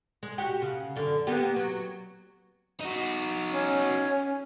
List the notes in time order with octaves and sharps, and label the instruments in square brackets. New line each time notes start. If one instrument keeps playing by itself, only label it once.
[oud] G#3
F#4 G4
C#3
F#2 D3
A#3 B3 G4
F#3
[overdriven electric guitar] D#4 F#4
[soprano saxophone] C#4